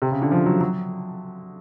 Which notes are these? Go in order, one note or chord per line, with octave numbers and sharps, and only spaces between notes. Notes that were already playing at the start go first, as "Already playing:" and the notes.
C3
C#3
D3
F3
F#3
F#3